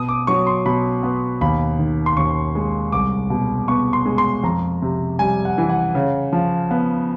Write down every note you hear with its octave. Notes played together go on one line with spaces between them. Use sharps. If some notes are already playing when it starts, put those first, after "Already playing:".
Already playing: B2 D#6
D6
F#3 C#6
C6
B2 B5
B3
D#2 B5
D#3
C6
D#2 C#6
G#3
C2 D6
B2
B3 C#6
C6
G#3
C6
F2 A#5
C3
G3 G#5
F#5
E3
F#5
C#3
F3
B3